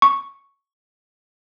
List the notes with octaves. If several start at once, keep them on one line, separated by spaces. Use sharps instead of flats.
C#6